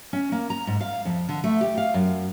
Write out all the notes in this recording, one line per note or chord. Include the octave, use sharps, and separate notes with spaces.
C#4
A#3
A#5
G#2
F5
F2
D3
A3
G4
F5
F#2